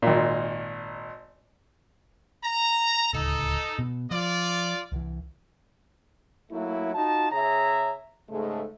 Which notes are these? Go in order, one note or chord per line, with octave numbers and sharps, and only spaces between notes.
G#1 A#2
A#5
D1 C#2 D#4 A4
B2
F3 F4 D5
C2 E3
F#3 A3 A#3 E4
D#4 F4 F#4 A5
C#3 G#4 C#5 E5 A#5
G#2 C#3 G#3 A3